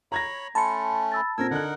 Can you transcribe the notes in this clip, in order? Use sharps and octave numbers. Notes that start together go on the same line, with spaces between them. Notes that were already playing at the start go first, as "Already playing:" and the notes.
C#5 A#5 B5 G#6 A#6
A3 C#4 A5 B5 C6 C#7
B5 E6 A6
A#2 C4 A#4 E6 G#6 A#6
D3 D#4 A#4 F#5 F#6